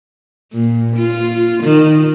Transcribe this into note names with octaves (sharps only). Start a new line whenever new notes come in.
A#2
F4
D#3